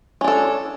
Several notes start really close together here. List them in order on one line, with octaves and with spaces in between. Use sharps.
C#4 D4 A4